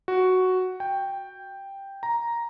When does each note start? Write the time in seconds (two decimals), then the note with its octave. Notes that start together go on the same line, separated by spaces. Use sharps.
0.08 F#4
0.80 G5
2.03 A#5